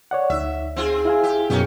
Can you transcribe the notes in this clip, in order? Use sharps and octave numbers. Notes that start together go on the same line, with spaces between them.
C#5 D5 F#5
D2 D#4 E5
C4 F4 G#4
E4 F5 G#5
G4
F#2 B2 A#3 C#4 G4